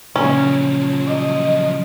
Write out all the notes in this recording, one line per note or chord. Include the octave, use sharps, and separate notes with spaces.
A#2 C#3 F3 F#3 C#4
D#5